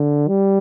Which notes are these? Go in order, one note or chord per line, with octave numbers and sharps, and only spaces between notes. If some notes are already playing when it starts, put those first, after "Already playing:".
Already playing: D3
G3